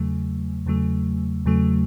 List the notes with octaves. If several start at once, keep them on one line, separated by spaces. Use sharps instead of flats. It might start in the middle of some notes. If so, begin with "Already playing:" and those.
Already playing: E2 C#3 F#3 A3
E2 C#3 F#3 A3
E2 C#3 F#3 A3